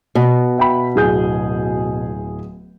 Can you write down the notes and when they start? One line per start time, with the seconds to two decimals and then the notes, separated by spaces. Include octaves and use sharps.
0.15 B2
0.58 E5 G5 B5
0.96 D1 G#4 G6